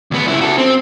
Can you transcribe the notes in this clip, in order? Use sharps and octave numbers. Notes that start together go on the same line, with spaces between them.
D2 B3
C#2 E4
F#4 A4
C4